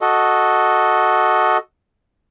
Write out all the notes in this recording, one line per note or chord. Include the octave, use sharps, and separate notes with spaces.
F#4 A4 D#5